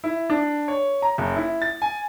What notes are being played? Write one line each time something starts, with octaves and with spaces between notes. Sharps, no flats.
E4
D4
C#5
A#5
F#1
E4
A6
G#5